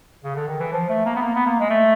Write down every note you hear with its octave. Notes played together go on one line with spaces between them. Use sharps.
C#3
D3
D#3
E3
F3
A3
A#3
B3
A#3
B3
A#3
G#3
A3